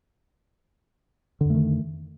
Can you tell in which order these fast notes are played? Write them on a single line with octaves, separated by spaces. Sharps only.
D3 F2 A3 D#3